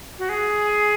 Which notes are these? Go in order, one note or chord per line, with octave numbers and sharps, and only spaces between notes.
F#4
G#4